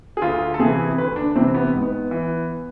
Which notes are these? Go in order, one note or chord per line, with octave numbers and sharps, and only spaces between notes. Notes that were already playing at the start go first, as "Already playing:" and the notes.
G#4
D2 F4
A4
C3 E3 G#4
D2 B4
D4
C3 E3 C4
B3
G#2
B3
E3